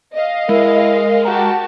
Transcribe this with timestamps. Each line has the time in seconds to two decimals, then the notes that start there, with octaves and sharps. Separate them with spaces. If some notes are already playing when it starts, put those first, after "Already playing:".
0.13 D#5 F5
0.49 G#3 E4 A#4
1.24 F#4 G4 A#4 A5